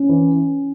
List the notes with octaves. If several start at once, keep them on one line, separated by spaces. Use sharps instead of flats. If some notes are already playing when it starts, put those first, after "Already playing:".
Already playing: C#4
E3